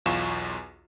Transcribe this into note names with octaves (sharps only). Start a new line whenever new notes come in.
B1 E2 F4 C#6 E7